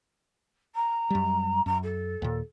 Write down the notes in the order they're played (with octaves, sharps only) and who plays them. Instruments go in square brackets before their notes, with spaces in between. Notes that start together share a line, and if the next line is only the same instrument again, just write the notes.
[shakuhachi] A#5
[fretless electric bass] F#2 G3
[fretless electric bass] F#2 [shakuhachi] A#5
[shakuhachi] A4
[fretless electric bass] D#2 A#2